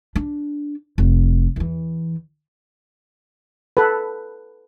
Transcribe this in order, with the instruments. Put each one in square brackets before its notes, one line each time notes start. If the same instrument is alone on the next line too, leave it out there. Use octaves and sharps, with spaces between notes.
[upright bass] D4
F1
E2 E3
[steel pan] A4 B4